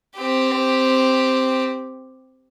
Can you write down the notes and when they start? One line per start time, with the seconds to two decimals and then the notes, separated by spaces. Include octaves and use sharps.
0.16 C4 G4